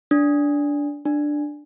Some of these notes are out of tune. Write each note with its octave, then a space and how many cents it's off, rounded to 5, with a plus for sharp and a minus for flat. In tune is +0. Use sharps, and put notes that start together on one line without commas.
D4 -15
D4 +5